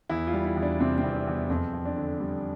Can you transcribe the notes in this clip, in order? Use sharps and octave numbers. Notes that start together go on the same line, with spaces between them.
E2 E4
F4
G3
E4
E2
D4
C3 C4
C4
E2
D4
E2
F2 C4
F2
D4
D3
G3